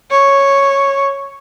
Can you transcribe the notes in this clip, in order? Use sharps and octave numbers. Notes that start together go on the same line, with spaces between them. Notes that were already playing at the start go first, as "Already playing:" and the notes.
C#5